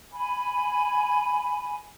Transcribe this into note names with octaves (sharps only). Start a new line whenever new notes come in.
G#5 B5